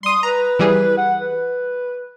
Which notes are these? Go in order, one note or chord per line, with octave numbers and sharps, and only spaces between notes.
G3 C6 D#6
B4 A#5
E3 G3 G#4
F#5
B4